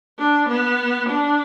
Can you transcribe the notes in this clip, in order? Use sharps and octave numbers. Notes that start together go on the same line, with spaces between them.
D4
B3
D4